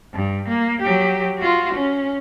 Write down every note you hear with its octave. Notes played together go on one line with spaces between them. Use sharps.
G2
A#3
F#3 G4
F4 F#4
C#4